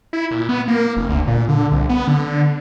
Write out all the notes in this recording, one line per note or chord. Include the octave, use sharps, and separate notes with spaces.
E4
A#2
B3
A#3
F1
D2
A#2
D3
C2
B3
D3